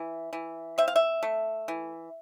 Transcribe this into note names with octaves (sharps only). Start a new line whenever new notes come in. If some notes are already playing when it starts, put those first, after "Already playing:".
Already playing: E3
E3
C4 E5
F5
E5
A3
E3